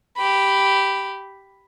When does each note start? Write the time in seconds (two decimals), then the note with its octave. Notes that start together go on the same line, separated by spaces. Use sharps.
0.17 G4 B5